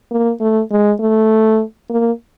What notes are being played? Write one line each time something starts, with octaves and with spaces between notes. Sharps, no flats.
A#3
A3
G#3
A3
A#3